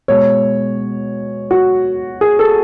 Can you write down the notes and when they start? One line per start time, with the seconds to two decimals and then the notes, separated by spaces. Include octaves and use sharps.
0.08 B2 G#3 C#5
1.51 F#4
2.21 G#4
2.39 A4